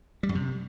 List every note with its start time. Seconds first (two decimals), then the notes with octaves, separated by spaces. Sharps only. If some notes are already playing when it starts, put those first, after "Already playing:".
0.23 G3
0.29 F#2
0.35 C3